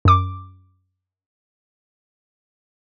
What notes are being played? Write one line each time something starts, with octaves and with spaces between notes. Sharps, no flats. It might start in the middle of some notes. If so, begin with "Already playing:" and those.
F#2 D6